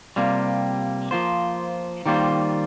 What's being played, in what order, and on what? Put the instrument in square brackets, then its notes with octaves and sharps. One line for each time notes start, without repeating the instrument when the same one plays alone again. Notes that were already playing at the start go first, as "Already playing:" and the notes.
[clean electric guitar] C3 G3 A#3 F4
F3 A#3 F4 C5
D#3 G3 A#3 F4 C5